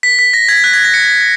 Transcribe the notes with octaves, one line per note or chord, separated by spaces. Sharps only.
B6
B6
A#6
G#6
F#6
G#6
A#6
C#7